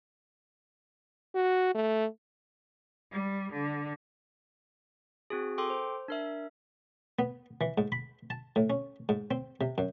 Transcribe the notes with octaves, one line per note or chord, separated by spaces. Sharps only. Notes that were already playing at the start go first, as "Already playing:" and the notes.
F#4
A3
G3
D3
C4 F#4 G#4
A4 G5 C6 D6
C5
D4 A#4 E5
B3
E3
G#2
B5
A5
A2
C#4
G#2
C4
C3
F#2